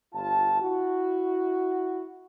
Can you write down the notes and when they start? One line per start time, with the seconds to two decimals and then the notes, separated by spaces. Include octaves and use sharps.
0.14 G1 F4 A5
0.61 E4 F#4